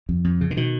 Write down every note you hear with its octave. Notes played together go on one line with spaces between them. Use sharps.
F2
F2
C#3
D3
B2 D#3